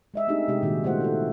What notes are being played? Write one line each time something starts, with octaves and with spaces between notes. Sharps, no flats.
G#3 D#5 E5
A3 C4 D4 D#4 G4 G#4
C3 G#3 G4
A#2 D#3 G3 F#4
G3 A3 B3 F4 C5 F#5
F#4 A4